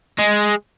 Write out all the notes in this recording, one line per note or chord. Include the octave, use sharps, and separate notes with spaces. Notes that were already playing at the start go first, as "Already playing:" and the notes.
G#3